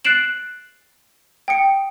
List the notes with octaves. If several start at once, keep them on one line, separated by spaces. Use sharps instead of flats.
F#6 A6 C7 D7 E7 F#7
G5 D#6 C#7